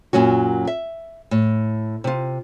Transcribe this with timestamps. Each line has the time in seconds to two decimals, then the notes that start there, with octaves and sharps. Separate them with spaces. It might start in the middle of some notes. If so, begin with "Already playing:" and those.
0.13 F#2 A#2 F#3 C#4 F#4
0.67 E5
1.31 A2
2.04 C3 F4